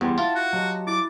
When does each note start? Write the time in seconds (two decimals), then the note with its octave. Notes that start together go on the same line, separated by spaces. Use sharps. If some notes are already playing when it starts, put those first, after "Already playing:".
0.01 E2 G3 B3 G4 F#5 C6
0.18 E4 F4 A5
0.35 F#4
0.53 F#3 G4 D#5 A5
0.87 E4 D6 A6